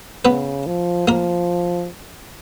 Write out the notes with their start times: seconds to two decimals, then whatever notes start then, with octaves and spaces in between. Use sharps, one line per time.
0.25 C#3 B3 B4
0.66 F3
1.08 F3 A#3 A#4